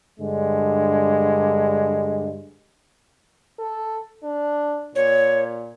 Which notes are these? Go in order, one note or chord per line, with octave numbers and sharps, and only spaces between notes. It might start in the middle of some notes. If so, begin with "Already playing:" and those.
G2 D3 G#3
A4
D4
A#2 C#5